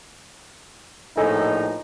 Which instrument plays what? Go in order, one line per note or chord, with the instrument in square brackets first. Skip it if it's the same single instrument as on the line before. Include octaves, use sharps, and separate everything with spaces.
[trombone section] A#1 A2 D#4 [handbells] A4 D#5 G#5